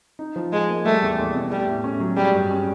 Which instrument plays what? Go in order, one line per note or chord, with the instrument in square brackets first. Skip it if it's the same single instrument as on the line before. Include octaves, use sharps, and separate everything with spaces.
[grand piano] D#4
F3
[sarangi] G#3 [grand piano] G#4
[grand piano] A#3
[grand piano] G3 [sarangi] A3
[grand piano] E2
E2
B2
[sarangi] G3 [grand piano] A3
[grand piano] A2
C#4
F#3
[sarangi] G3 [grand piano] G#3
[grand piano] G2
C#4